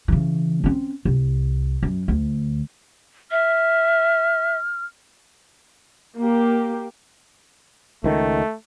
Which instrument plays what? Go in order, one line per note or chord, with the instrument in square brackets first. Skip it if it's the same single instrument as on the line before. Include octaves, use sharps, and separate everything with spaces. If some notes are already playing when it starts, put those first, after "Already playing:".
[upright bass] C#3 E3
C4 C#4
C2
F#2
D2
[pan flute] E5 [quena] F6
[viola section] A#3 G4
[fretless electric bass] C#2 D#3 [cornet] A3